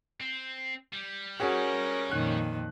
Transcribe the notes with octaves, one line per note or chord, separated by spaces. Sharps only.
C4
G3
C#4 F#4 G#4 A#4
F2 A#2 D#3 F#6